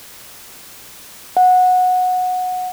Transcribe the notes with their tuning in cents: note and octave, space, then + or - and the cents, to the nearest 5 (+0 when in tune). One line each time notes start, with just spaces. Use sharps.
F#5 -15